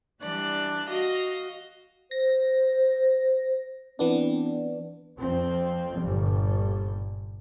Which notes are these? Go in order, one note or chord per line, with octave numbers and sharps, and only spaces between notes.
E3 G3 D4 D5 F#6
F#4 D#5 F5
C5 A#6
E3 B3 C4 D4
F2 F3 C4
G1 A#2 G3